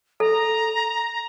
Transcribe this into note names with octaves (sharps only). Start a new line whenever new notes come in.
A4 A#5